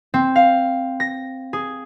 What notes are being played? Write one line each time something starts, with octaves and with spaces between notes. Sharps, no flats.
C4
F5
A#6
G#4